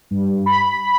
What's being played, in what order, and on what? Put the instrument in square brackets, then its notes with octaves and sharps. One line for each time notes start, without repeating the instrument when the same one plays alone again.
[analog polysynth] G2
B5